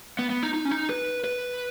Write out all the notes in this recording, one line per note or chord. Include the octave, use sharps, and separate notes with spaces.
B3
B3
D#4
D#4
C#4
D#4
B4
B4